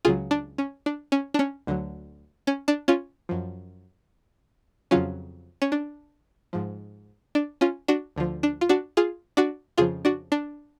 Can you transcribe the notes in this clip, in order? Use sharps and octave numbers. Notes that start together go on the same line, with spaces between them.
C#2 C#3 F#3 F4 G#4
D4
C#4
D4
C#4
D4
C#4
D2 D3 F#3
C#4
D4
C#4 F4
F#2 F3
F2 C#3 F#3 C#4 F4
C#4
D4
G#2 F3
D4
C#4 F4
D4 F#4
D2 D3 F3
D4
F4
D4 F#4
F4 G#4
D4 F#4
F2 C#3 F3 F4 G#4
D4 F#4
D4